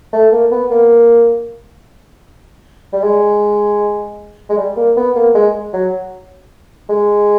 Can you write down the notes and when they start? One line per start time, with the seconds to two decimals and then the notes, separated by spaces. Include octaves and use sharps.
0.13 A3
0.32 A#3
0.51 B3
0.70 A#3
2.93 G3
3.03 G#3
4.49 G#3
4.58 G3
4.77 A#3
4.97 B3
5.16 A#3
5.34 G#3
5.73 F#3
6.89 G#3